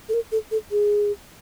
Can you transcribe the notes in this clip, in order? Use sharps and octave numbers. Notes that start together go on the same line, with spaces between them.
A4
A#4
A4
A4
G#4